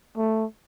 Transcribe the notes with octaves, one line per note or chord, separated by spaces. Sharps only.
A3